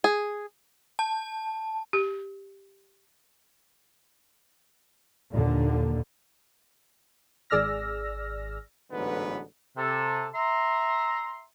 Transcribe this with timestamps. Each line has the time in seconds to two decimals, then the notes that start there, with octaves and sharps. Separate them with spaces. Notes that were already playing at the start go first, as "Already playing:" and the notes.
0.04 G#4
0.99 A5
1.93 G4
5.31 D#2 A#2 D3
7.50 G#1 G#4 D5 E6 F6 A#6
8.92 A1 G#2 D3 F#3 B3 B4
9.77 C3 A4
10.35 E5 A#5 C6